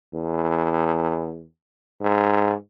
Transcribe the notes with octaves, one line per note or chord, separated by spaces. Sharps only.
E2
G#2